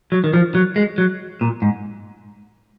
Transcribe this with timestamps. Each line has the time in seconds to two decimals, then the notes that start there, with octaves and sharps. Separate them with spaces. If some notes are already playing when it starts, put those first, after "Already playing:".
0.12 F#3
0.24 D#3
0.34 F3
0.55 F#3
0.76 G#3
0.98 F#3
1.41 A#2
1.62 G#2